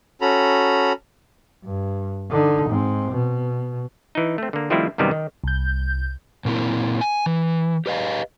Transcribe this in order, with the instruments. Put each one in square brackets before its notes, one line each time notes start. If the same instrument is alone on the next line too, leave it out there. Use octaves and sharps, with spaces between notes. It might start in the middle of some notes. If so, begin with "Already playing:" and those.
[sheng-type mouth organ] C#4 F#4 A4 A#5 B5
[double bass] G2
D3 D#4
G#2 C4
B2
[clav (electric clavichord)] E3 D#4
A3 C4
D3 A#3
D#3 F3 G3 A3 C4 E4
F#2 C3 D#3 G3 A#3 B3
D#3
[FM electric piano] C2 G6
[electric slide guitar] A#2 A#3 C4 E4
G#5
E3
G4 B4 D#5 F5